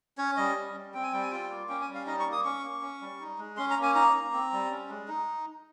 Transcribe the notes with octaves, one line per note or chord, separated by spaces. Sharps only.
C#4 C#5
G3 D#5
C#4
G3
C4 G5
G#5
G3 G5
G#5
F4 G5
A#3
C#4 G5
G#5
G3
F5
D#4 D#5
C#6
A#3
D#6
C#4 C#6
A#3
C#4
G3
D#4
G#3
C#4 C6
A#5
A#3
G#5
D#4 A#5
A#3
C4
G3
C#4
G#3
D#4